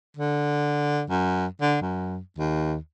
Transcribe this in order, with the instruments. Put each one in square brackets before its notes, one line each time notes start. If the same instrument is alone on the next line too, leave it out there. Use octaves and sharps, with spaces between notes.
[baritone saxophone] D3
F#2
D3
F#2
D#2